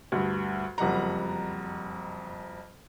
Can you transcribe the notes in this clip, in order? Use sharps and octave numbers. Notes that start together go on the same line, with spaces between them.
D2 G2
F#1 F2 G3 F#5 A#5